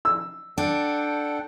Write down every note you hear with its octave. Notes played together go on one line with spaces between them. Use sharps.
E6
D4 A4 F#5 G5